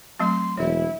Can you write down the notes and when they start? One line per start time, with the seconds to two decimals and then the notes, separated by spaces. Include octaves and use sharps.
0.20 F#3 A3 C4 C6
0.57 E1 E4 C#5